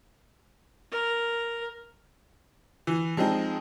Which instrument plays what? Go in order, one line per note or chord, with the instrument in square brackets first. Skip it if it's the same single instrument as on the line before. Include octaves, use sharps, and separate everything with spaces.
[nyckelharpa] A#4
[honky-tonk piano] E3
F3 G#3 C4 D#4